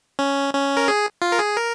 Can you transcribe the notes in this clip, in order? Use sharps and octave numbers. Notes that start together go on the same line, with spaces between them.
C#4
C#4
A#4
G#4
F4
A#4
G#4
A#4